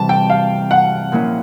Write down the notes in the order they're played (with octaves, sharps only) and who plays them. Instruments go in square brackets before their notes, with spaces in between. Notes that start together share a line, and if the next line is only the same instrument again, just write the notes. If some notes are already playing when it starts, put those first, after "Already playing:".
Already playing: [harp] C3 E3 G3 C4 [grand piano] A5
[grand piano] G5
F5
F#5
[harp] A#2 F3 A#3 C#4 E4